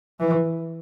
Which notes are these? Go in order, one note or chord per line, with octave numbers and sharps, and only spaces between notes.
E3